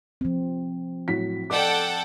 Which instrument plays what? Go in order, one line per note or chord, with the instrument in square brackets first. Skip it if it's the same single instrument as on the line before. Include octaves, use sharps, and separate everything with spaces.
[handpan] F3 C4
[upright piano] A2 F#3 B6
[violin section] A4 F#5 G5 [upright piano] D5 D#5 D6